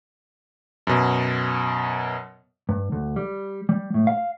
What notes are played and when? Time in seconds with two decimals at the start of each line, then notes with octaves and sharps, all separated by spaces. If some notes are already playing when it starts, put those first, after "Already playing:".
0.87 F#2 B2
2.69 G2
2.92 D2
3.16 G3
3.69 G3
3.94 A2
4.07 F5